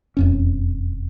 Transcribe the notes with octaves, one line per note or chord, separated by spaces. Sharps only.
E1 F2 C#4